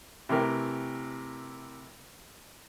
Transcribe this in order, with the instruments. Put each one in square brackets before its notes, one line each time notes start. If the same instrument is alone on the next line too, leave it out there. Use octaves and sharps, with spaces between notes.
[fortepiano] C3 E3 A3 A#4 G5